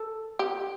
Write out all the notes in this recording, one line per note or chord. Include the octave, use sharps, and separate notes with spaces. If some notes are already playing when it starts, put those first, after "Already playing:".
Already playing: A4
G4